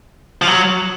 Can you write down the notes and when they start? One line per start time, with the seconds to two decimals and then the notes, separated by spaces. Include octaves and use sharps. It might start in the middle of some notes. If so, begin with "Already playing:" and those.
0.42 F3
0.47 F#3